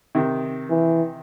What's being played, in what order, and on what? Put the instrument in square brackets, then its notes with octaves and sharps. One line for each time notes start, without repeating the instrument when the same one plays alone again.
[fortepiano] C3 D#3
[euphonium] E3